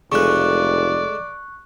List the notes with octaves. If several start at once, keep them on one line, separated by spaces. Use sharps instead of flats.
F1 C#3 G#3 A3 D5 C#6 F#6